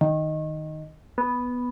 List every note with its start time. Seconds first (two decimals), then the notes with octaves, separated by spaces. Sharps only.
0.01 D#3
1.18 B3